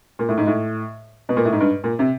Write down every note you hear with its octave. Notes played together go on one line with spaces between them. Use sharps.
A#2
A2
G#2
A2
B2
A#2
A2
G#2
G2
A#2
C3